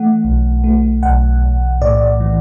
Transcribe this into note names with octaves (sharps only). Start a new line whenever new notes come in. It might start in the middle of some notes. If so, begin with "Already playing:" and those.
Already playing: E3 A3 F#5
B1
A3
B1 F#5
B1
A2 D5
E3